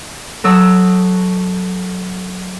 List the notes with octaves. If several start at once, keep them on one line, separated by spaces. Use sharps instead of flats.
F#3 A4 D#6 E6